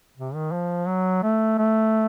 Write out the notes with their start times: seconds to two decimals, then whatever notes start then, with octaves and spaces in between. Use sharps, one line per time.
0.18 C3
0.35 D#3
0.52 F3
0.88 F#3
1.23 A3
1.58 A3